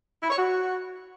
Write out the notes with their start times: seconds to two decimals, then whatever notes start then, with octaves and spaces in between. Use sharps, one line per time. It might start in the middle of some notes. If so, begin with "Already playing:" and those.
0.23 E4
0.30 C#5
0.38 F#4